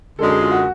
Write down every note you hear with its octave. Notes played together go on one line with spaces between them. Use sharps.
F#2 D3 G#3 A4
G#4
F4
F#4